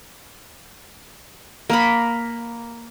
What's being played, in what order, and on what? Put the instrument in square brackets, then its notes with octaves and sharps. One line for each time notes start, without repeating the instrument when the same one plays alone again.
[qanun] A#3 A#4 B5